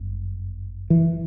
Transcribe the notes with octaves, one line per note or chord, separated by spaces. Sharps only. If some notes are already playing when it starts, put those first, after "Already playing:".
Already playing: G1 F#2
E3